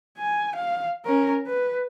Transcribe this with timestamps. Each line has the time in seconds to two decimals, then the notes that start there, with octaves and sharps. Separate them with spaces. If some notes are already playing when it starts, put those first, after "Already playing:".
0.18 G#5
0.56 F5
1.05 C#4 A#4
1.47 B4